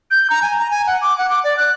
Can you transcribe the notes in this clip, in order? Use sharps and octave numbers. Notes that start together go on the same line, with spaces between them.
G6
A#5
G#5
A#5
G#5
F#5
D6
F#5
D6
D5
F#6